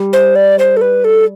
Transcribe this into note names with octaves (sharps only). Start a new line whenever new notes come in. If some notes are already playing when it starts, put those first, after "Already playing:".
Already playing: G3
C5
D5
C5
A4
B4
A4